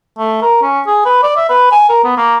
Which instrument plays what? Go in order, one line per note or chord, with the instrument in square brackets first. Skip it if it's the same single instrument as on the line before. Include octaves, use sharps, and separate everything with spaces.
[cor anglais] A3
A#4
C#4
G#4
B4
D5
E5
B4
G#5
A#4
B3
A#3